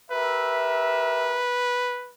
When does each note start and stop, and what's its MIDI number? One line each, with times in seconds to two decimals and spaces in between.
0.11 1.45 67
0.11 1.45 70
0.11 2.13 71
0.11 1.45 76